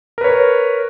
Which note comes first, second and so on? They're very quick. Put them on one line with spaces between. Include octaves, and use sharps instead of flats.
A#4 B4 C#5